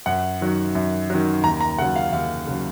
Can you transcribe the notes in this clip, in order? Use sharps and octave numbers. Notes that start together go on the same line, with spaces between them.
F#2 F#5
D#3 F#3
F#2
D#3 F#3
D#2 A#5
A#5
C#3 F#3 F#5
F5
D#2 F5
C#3 F#3